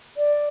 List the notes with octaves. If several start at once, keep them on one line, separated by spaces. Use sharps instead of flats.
D5